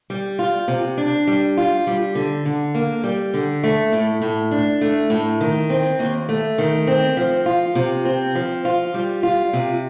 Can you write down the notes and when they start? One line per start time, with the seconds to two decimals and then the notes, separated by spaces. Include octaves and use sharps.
0.10 G3
0.39 F4
0.68 C3
0.97 D4
1.27 G3
1.57 F4
1.87 G3
2.15 D3
2.45 D3
2.74 A#3
3.04 G3
3.34 D3
3.64 A3
3.92 A2
4.22 A2
4.51 D4
4.81 A3
5.10 A2
5.41 D#3
5.70 C4
5.99 D#2
6.29 A3
6.58 D#3
6.87 C4
7.17 F3
7.46 F4
7.75 C3
8.05 C4
8.35 F3
8.65 F4
8.94 G3
9.23 F4
9.53 C3